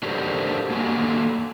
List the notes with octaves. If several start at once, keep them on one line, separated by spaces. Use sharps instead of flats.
D4 F#4 G4 A4 A#4 C5
A#3 F#4 A4 G#5